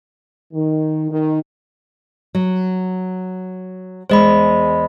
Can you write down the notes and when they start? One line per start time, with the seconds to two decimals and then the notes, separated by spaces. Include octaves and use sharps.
0.54 D#3
1.10 D#3
2.35 F#3
4.10 E2 G#3 C5 D#5 B5